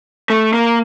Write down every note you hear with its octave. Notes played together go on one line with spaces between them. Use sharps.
A3
A#3